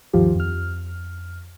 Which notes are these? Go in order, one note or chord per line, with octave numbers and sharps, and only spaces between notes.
D2 G2 D#3 F3 F4 G4
F2 F6